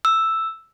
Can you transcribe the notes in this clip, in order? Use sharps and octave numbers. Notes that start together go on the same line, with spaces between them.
E6